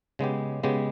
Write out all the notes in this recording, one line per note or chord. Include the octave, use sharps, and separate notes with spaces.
C#3 G#3 B3 G4
C#3 G#3 B3 G4